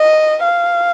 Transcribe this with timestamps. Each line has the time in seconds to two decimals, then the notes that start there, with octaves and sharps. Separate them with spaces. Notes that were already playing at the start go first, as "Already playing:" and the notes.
Already playing: D#5
0.44 F5